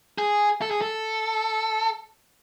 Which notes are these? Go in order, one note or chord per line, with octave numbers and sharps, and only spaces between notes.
G#4
A4
G#4
A4